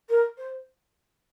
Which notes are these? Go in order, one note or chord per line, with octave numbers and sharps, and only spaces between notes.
A#4
C5